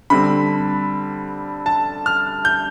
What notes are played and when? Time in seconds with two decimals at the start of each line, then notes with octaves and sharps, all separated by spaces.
0.10 D3 G3 C4 B5
1.66 A5
2.06 F6
2.45 G6